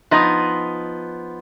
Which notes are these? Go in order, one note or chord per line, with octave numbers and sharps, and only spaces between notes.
F3 B3 D#4 D#5